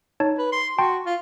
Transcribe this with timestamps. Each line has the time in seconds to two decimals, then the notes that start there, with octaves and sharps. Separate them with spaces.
0.20 D#4 C#5 A5
0.38 B4
0.52 C6
0.78 F#4 G5 A5 C6
1.05 F4